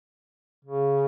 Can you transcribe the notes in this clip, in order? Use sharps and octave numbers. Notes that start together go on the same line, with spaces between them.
C#3